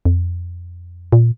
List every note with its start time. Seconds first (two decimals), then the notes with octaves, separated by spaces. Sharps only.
0.05 F2
1.12 A#2